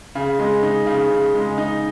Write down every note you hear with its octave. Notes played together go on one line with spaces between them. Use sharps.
C#3
G#3
D#4
C#3
C#3
G#3
D#4